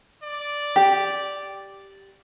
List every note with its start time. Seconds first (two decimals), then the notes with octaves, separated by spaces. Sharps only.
0.23 D5
0.76 G4